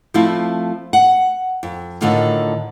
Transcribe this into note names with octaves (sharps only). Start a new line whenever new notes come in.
F3 A3 C4 E4 F4
F#5
F2
A2 D3 D#3 F4